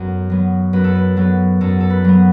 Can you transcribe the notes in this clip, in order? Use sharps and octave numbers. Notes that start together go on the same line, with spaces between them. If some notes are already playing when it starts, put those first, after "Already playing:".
Already playing: F#2 F#3 B3 A4
F#3 B3
F#2 B4
A4
B4
F#3 B3 A4
F#2 A4
A4
B4
F#3 B3